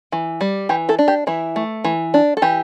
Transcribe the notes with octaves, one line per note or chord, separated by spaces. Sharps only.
E3
G3
E3 G4
E4 A4
D4
G4
E3 E4
A3
E3
D4
A4
E3 G4